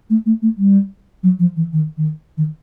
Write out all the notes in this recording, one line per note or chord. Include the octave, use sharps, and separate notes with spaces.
A3
A3
A3
G3
F#3
F3
E3
D#3
D#3
D#3